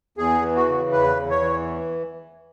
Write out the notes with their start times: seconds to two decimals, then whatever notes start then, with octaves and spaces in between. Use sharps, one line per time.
0.18 E2 G#4
0.42 E3
0.56 F#4
0.68 C#3
0.92 E2 B4
1.17 E2
1.30 C#5
1.41 E3